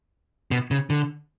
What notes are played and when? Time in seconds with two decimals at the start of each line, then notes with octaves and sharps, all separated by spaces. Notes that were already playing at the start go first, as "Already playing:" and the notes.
0.51 B2
0.71 C#3
0.90 D3